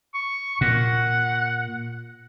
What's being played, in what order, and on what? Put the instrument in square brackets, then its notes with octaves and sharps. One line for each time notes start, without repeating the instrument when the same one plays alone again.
[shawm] C#6
[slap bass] A#2 [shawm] F#5